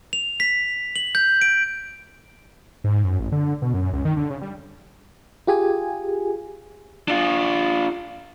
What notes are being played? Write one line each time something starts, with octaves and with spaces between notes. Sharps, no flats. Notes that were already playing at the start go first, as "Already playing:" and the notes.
F7
B6
F#7
G6
D7
G#2
F#2
A1
D3
B2
F#2
C#2
D#3
D3
C#3
G3
F4 G4 G#4 G#5
D4 F4